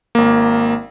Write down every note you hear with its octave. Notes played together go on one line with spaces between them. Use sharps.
G#1 A#3